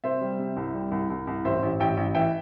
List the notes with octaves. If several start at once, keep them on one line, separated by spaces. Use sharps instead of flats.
C3 C5 E5
G3
C3
C2
G3
C2
C2
C2
A1 C5 E5
A1
A1 E5 G5
A1
E3 E5 G5